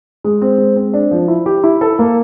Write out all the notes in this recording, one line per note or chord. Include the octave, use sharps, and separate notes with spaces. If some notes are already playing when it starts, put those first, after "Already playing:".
G#3
C4
G#3
C4
D4
F3
E4
G4
E4
A4
A#3